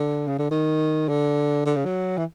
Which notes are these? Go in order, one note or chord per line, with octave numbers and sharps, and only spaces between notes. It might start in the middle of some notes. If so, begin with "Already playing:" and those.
Already playing: D3
C#3
D3
D#3
D3
D3
C#3
F#3
E3